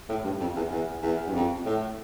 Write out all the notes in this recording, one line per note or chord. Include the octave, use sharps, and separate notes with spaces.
A2
G2
F2
E2
E2
E2
G2
F2
A2